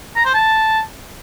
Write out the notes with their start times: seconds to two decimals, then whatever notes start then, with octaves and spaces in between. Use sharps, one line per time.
0.16 A#5
0.25 C5
0.34 A5